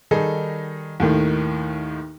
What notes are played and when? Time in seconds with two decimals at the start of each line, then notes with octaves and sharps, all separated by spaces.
0.11 D#3 G3 D#4 G#4 A4
1.00 D#2 A2 D#3